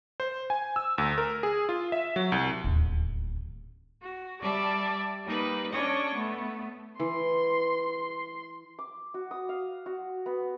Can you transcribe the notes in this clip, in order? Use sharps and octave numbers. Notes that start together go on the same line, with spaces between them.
C5
G#5
E6
D2
A#4
G#4
F4
E5
F#3
C2
D1 D#2
F#4
G3 D5 E5 A5
G3 A#3 D#4 B4
C#4 D4 C#5 D#5 C#6
A3 B3
E3 C6
D6
F#4
D#6
F5
F#4
B3